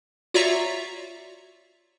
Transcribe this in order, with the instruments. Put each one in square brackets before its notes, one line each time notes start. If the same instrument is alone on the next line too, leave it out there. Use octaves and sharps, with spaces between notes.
[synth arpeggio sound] F4 F#4 C#5 D5 E5 A#5